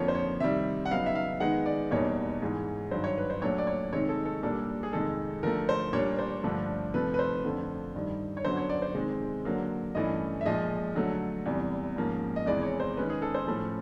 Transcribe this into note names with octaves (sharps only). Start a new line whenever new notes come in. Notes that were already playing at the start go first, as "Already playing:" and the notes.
Already playing: F2 D3 F3 A#3 C#5
C5
C#5
C3 D#3 G3 E5
F#5
C#3 F#3 B3 D#4 F5
E5
F5
D#3 G#3 B3 D#4 F#5
D5
E2 B2 G3 A#3 D#4 C#5
G#2 E3 G#3
G2 D#3 F#3 C5
C#5
B4
C5
A#2 F#3 A3 D4 C#5
D5
C#5
C3 D#3 G#3 C4 D#4 C#5
A4
A4
A#2 G3 A#3 D4 A4
G#4
F2 C3 D#3 G#3 A4
D3 F3 A3 A#4
C5
A#2 G3 A#3 D4 C#5
C5
G2 D3 F3 A3 D4
C3 F3 A3 B4
B4
C5
F2 D3 F3 A3
G2 D#3 G3
C#5
F#2 D3 F#3 B3 D4 C5
C#5
D5
C5
C3 D#3 G#3
D3 F#3 A#3
G2 E3 A3 C#4 D#5
E5
A#2 F3 G#3 D#5
D3 F#3 A3
E2 C3 E3 G3
G#2 F3 A#3 C#4
D#5
E2 C3 E3 G#3 D5
C#5
C5
D#3 G#3 C#4 B4
G#4
A4
C5
A2 F3 A3 C#4